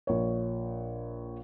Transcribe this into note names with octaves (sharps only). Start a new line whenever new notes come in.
A#1 C#5